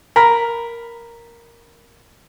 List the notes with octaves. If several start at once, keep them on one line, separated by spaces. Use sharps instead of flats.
A#4 B5